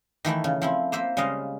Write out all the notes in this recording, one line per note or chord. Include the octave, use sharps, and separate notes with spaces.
D#3 E3 A3 E4
C#3
F3 C4 E4
A#3 C5 E5
C#3 G3 G#3 D#5 F5